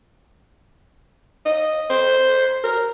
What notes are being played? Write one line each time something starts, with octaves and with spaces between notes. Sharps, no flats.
D#5
C5
A#4